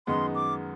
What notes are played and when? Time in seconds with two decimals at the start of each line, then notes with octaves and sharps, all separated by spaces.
0.07 F#2 D#3 G#3 B3 D#4 C6
0.35 D6